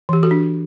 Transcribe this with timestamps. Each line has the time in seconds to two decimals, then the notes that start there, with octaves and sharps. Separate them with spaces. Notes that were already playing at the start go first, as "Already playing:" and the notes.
0.09 E3 G4
0.23 F#4 A4
0.31 D4